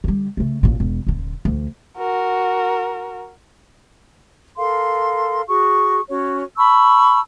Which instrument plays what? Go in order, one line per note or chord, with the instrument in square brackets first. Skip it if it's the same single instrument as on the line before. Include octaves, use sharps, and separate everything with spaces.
[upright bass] D3 G3
C#3 A3
A1 A#2
E1
D#1 D3
D2 E3
[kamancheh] F#4 A#4
[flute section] A4 A#4 F5 C6
F#4 G#4 C#6
C#4 F#4 C#5
A5 B5 C#6 E6